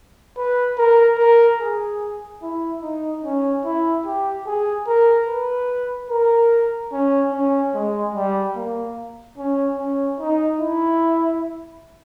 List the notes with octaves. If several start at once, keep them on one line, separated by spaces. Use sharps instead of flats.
B4
A#4
A#4
G#4
E4
D#4
C#4
E4
G4
G#4
A#4
B4
A#4
C#4
C#4
G#3
G3
A#3
C#4
C#4
D#4
E4